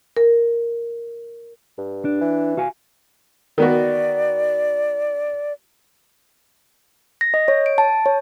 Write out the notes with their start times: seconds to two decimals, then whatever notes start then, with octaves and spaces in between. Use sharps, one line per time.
0.17 A#4
1.78 G2
2.05 D4
2.21 E3
2.57 F#4 F5 G#5
3.58 D#3 B3 F#4 D5
7.21 A#6
7.34 D#5
7.48 C#5
7.66 D7
7.78 A5
8.06 C#5